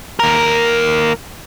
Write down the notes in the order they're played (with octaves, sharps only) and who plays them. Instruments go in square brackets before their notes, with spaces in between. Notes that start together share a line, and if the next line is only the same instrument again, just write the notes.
[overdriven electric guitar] D#2 A#4